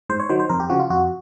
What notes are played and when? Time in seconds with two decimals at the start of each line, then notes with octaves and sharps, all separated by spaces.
0.09 G#2 C5
0.20 C#5
0.29 D#3 F#3 C5
0.40 C5
0.49 F2 A#4
0.60 G4
0.69 C#3 F3 F#4
0.80 F4
0.90 F2 F#4